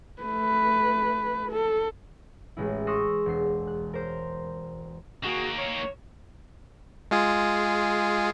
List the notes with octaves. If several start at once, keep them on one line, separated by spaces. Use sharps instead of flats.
A3 B4
A4
A1 G#3 E4
C6 C#6 D#6 E6 F#6 A#6
E1 C7
F#6
A#4 C5
D#3 A#3 F#4 G#4
C#5
G#3 F4 G#4